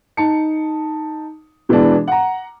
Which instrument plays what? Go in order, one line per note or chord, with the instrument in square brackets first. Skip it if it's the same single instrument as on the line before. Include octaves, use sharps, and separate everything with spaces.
[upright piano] D#4 A5 C#7
B2 E3 G#3 B3 D4
F#5 A#5